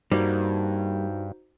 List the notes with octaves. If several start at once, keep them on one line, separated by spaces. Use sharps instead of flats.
G2 G3 A#3 D#4 F#4 C5